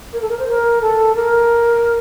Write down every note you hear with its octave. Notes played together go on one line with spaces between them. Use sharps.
A#4
A4
A#4
C5
A#4
A4
A#4